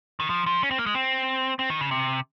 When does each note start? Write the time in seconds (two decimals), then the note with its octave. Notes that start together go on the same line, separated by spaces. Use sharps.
0.20 D#3
0.30 F3
0.46 F3
0.63 C#4
0.71 C4
0.78 A#3
0.86 G#3
0.95 C4
1.59 C4
1.70 D#3
1.81 C#3
1.91 C3